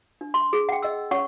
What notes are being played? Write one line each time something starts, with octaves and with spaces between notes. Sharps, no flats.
D4
C6
G#4
F#5 G5
D#5 E6
C#4 C#5 F#5 C#6